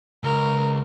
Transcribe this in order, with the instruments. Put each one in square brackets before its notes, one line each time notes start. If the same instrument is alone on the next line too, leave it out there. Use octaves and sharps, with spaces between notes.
[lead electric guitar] C#2 [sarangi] A#4